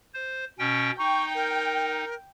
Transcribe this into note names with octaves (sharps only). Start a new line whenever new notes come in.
C5
B2 C#4 G5
D#4 G5 C#6
A#4